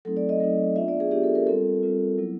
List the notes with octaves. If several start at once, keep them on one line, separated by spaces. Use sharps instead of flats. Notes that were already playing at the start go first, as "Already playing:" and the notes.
F#3 A3 C4 D#4 A4
D5
D#5
F#3 A3 C4 D#4
B3 D4 F4 E5
D5
G#4
B3 D4 F4 G4
A4
A#4
G3 C4 F4 A4
G3 C4 F4
F#3 B3 E4